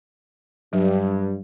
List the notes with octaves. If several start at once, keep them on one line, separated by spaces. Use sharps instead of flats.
G2 F#3